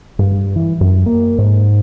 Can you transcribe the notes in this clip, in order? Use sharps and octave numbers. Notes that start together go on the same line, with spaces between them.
G2
E3
F#2
A#3
G#2